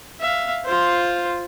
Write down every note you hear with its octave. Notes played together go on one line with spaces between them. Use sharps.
E5 F5
F4 C5